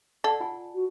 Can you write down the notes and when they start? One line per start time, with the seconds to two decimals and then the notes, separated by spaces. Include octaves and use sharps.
0.24 A4 D5 F#5 A5
0.40 F4 F#5 G#5
0.75 F#4